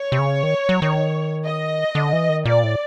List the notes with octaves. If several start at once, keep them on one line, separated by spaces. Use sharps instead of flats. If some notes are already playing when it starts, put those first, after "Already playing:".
Already playing: C#5
C3
C#3
D#3
F#3
D#3
D#5
D3
E3
D#3
A#2 D5
A2